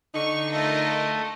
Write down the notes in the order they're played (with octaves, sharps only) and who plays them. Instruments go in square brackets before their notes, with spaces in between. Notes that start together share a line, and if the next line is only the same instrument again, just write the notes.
[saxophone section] D3 D#4 [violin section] C#6
[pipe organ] A3 [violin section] F4 A#4 D#5